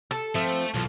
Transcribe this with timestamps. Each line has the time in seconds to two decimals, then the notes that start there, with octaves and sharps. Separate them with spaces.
0.11 A4
0.35 F3 A3 C4 E5
0.74 B1 E3 F3 F4